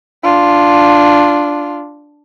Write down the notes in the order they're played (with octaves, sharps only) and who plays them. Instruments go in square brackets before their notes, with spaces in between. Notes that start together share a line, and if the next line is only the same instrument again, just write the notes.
[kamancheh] D4 F4